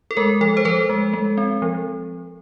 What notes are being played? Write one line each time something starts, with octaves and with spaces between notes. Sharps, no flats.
A4
G#3 A#4
F3 A4
C5
F3 A4 B4
G#3
G#3
C4
F3